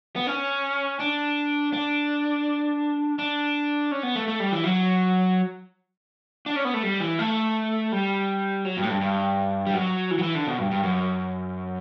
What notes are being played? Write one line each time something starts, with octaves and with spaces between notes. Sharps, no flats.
B3
C#4
D4
D4
D4
C#4
B3
A3
A3
G3
E3
F#3
D4
C#4
B3
A3
G3
E3
A3
G3
F#3
G2
A2
G2
G2
G3
F#3
E3
F#3
E3
D3
B2
G2
G2
F#2